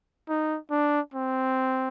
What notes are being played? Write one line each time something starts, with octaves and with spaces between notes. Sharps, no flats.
D#4
D4
C4